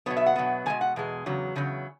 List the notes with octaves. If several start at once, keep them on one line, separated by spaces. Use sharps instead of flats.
B2 F#3 B3 C#5
E5
F#5
B2 F#3 B3
E2 B2 G#3 G#5
F#5
E2 B2 G#3
E2 C#3 F#3
E2 C#3 F#3